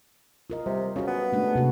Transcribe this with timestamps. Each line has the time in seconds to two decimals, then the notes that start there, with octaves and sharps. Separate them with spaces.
0.50 F4 A#4 D#5
0.66 C3 G3
0.96 C#3 C#4 F#4
1.08 B3
1.33 G#3 A3 D4
1.55 C3 A#3 F#4